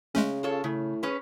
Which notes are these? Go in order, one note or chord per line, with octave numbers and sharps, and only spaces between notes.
C#3 G#3 A3 C#4
F4 A4 C#5
A2 C#3
C#4 G#4 B4